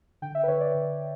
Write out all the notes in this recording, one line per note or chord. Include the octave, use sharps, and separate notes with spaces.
D3 G5
E5
B4
D3 C#5
D5
D3